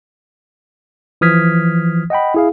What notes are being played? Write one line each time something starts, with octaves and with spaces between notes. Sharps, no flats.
E3 F3 D#6 F6 G#6 B6
D#5 F#5 G5 B5
E4 G#4 F5